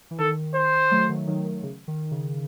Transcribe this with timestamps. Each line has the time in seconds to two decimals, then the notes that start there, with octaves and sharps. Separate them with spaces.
0.11 E3
0.19 D#3 A4
0.55 C5
0.91 F#3 A3
1.09 D#3 F#3
1.27 D#3 F#3
1.45 D#3
1.63 C#3
1.88 D#3
2.11 C#3